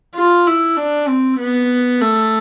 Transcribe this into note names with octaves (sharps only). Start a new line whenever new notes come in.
F4
E4
D4
C4
B3
A3